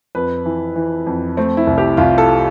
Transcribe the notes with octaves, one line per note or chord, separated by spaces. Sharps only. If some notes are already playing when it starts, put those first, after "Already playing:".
F2 B4
E3
E3
F2
A3 C4
E4
C2
G4
C2 F4
A4